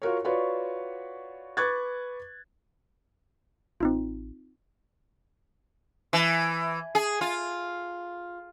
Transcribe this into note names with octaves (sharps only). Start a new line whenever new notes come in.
F4 F#4 A#4 C#5
F4 F#4 B4 C#5 D5
B4 C#6 D6 F#6 G#6 A6
A1 C4 D#4 F4
E3
G#4
F4